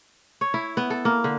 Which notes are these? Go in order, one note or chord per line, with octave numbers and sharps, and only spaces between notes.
C#5
E4
B3
A4
A#3
D3